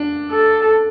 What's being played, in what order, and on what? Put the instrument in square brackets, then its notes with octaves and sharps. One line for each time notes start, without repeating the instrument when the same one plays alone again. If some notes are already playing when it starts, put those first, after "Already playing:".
Already playing: [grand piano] D4
[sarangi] A4